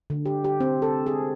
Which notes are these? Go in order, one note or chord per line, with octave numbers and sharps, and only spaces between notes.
D3
G4
G4
C4
A4
G#4